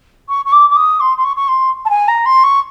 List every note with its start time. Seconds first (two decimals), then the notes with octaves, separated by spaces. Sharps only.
0.29 C#6
0.45 C#6
0.52 D6
0.69 D6
0.76 D#6
1.00 C6
1.17 C6
1.24 C#6
1.36 C#6
1.48 C6
1.85 A5
1.90 G#5
2.08 A#5
2.26 C6
2.43 C#6